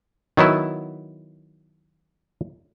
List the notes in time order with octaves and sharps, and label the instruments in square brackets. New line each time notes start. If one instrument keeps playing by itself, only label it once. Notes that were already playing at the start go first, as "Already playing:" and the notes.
[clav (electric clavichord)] D#3 F#3 B3 E4